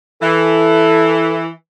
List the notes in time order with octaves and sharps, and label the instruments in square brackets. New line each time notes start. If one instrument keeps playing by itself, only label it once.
[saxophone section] E3 [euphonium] A4